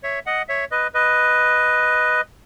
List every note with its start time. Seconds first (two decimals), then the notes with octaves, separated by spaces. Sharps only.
0.03 C#5 E5
0.26 D#5 F#5
0.48 C#5 E5
0.71 B4 D#5
0.94 B4 D#5